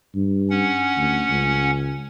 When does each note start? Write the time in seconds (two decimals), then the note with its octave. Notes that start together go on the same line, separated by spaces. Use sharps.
0.15 G2
0.50 C#4 F#5
0.96 D2
1.30 C#2